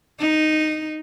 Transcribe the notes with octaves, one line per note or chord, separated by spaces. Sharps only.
D#4